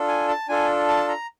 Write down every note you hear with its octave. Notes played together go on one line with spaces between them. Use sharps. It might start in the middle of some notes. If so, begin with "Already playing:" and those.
Already playing: D4 F4 A4
G#5
A5
D4 F4 A4 G#5
A5
A#5